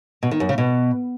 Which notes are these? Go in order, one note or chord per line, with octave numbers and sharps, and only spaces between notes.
B2
D#3
F#2
C#3
B2